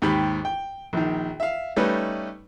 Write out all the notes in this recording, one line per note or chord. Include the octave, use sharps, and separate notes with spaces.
D#2 G#2 G4 B5
G5
A#1 D#3
E5 F5
G3 A3 C#4 D#4 B4 D#5